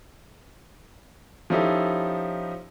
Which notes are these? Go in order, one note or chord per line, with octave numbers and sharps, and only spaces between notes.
F3 C#4 D#4 E4 G4 A4